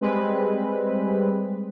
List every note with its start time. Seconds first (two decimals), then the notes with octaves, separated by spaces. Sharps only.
0.01 G3 G#3 C4 B4